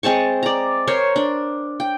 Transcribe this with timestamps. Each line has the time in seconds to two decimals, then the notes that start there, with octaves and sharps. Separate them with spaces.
0.03 G#3 C4 A5 C#6
0.43 D5 A#5
0.87 A#4 C5 C#5
1.16 D4
1.80 G5